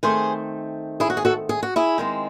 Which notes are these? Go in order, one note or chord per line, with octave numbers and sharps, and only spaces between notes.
D#3 A3 C4 G#4 C5
E4 G#4
F#4
G#4
F#4 A4
G#4
F#4
E4 G#4
D#3 G#3 C4